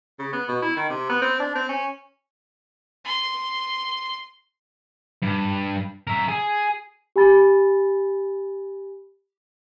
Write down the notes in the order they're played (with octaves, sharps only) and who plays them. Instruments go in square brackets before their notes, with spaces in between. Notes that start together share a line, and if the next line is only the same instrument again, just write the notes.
[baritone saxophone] C#3
B3
B2
E4
D#3
C3
B3
C4
D4
C4
C#4
[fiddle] C6
[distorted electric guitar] G2
A#4 E5
G#4
[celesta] G4 G#5 B5 A6